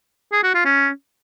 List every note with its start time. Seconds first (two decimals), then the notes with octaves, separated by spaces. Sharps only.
0.32 G#4
0.43 F#4
0.54 F4
0.65 C#4